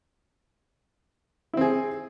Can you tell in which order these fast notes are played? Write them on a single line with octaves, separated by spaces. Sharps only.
E4 C4 G#4